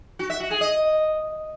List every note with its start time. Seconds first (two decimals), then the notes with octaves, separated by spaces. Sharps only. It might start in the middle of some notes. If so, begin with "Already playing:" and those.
0.19 F#4
0.30 E5
0.40 F#4
0.50 G#4
0.61 D#5